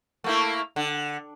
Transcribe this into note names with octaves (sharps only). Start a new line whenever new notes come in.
A3 A#3 E4
D3